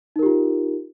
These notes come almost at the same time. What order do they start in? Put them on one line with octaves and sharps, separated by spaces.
D#4 A#4 G4 F4